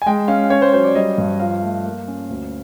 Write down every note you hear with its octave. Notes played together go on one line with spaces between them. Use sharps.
G#5
G#3 G5
C#4 F5
C#4 C#5
C5
F#3 C5
D5
G3 D#5
G2
F3 F5
A3
A#3
C#4
D2